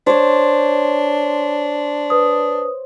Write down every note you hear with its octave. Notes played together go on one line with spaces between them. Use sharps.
D4 C5 C#5
B4 D#6